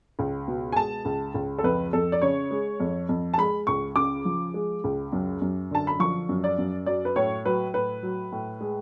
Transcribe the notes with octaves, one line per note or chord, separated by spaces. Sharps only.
C#2
B2
G#5
G#3 A5
C#2
C#2
A4
F2 B4
F2 A4
D5
C#3 C#5
G#3
F2
F2
A5
G#3 B5
C#2 C#6
C#3 D6
F3
G#3
C#2
F#2
F#2
D3 A5
B5
F3 C#6
F#2
D5
F#2
F#3 D5
B4
A2 C#5
F#3 B4
A2 B4
F#3
A2
G#3